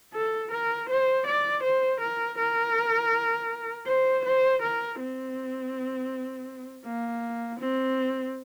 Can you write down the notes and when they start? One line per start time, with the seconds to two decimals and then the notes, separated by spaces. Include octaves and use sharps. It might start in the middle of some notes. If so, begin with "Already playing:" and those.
0.13 A4
0.51 A#4
0.89 C5
1.26 D5
1.63 C5
2.00 A#4
2.38 A#4
3.87 C5
4.25 C5
4.62 A#4
4.99 C4
6.85 A#3
7.59 C4